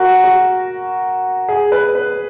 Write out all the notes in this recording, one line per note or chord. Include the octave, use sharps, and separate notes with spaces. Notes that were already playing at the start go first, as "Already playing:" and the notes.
Already playing: F#4 A#4
F#4
G#4
B4
B4